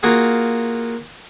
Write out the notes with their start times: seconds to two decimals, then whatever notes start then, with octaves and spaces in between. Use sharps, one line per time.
0.03 A#3 F4 F#4 G#4